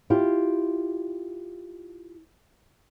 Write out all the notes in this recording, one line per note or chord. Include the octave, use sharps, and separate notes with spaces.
E4 F4 G4